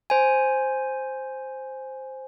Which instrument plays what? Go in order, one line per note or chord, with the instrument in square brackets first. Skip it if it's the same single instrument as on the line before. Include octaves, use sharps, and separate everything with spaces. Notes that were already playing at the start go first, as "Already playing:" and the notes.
[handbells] C5 G#5